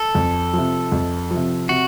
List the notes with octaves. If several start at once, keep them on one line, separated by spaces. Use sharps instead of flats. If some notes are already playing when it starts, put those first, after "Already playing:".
Already playing: A4
F2
C3 F3
F2
C3 F3
C3 F#4